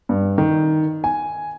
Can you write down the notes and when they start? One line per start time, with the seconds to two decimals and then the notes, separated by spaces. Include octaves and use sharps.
0.09 G2
0.38 D#3
1.04 G#5